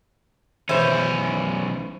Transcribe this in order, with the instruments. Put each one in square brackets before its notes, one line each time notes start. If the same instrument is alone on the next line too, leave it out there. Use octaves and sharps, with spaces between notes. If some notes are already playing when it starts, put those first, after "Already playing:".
[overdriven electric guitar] B1 C#4 [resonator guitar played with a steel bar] E3 C5